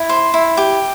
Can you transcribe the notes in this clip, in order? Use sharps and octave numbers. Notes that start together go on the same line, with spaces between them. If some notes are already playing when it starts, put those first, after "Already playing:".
Already playing: E4
C5
E4
G4